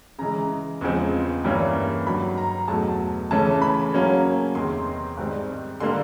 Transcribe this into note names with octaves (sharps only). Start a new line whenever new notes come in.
C#3 E3 G#3 A#5
E2 C#3 F3 G#3 C4
G2 E3 G3 A#3 C#4
G2 D#3 F#3 B5
A#5
E2 B2 F#3 A3 A5
C#3 E3 A3 C#4 A5
B5
C#3 F#3 A#3 C#4
E2 C3 D#3 C6
G#2 D#3 G3 C4
D3 G3 A#3 C6